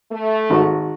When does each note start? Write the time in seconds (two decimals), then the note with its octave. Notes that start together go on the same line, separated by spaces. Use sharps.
0.11 A3
0.50 G#1 F#4 C#6